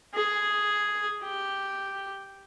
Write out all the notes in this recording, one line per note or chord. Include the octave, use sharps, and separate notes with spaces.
G#4
G4